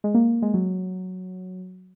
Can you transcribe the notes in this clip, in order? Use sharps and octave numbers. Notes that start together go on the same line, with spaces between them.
G#3
A#3
G#3
F#3